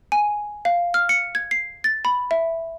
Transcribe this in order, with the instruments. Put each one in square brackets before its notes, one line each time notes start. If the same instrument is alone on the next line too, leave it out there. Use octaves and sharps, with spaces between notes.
[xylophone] G#5
F5
F6
C#7
G#6
C7
A6
B5
E5